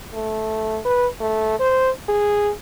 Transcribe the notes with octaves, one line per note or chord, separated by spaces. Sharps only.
A3
B4
A3
C5
G#4